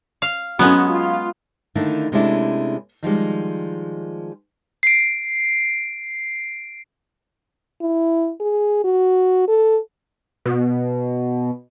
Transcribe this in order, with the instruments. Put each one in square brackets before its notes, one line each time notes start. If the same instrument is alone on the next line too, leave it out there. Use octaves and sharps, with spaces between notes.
[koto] F5
[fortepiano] F#3 C#4 [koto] G#3 B3 [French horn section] F#4
[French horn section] F4
[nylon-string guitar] D3 D#3 A3 A#3 D4 E4
C3 G#3 A3 C#4 D4 E4
D#3 F3 G3 G#3
[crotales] C7 D7
[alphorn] E4
G#4
F#4
A4
[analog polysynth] B2